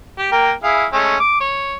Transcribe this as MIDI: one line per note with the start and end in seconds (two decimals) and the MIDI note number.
0.19 0.30 67
0.32 0.52 58
0.32 0.52 70
0.32 0.52 79
0.64 0.85 64
0.64 0.85 68
0.64 0.85 77
0.92 1.15 56
0.92 1.15 57
0.92 1.15 61
1.20 1.40 86
1.40 1.77 73